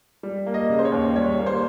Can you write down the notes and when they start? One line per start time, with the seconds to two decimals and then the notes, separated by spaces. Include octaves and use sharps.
0.23 G3
0.46 A#3
0.54 D#5
0.69 C#3
0.79 C5
0.85 C#5
0.92 D#2
1.16 G3 C#5
1.39 A#3
1.46 C5